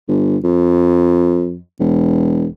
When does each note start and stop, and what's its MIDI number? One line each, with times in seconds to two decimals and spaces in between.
0.08 0.37 31
0.44 1.59 41
1.80 2.48 28